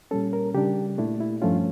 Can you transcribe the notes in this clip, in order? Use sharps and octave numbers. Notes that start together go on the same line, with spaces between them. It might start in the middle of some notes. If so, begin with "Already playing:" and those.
A#2 G3 C#4 A4
A#4
C#3 G3 D4 G4
A#2 A3 D4 E4
E4
G2 F3 A3 C#4 F4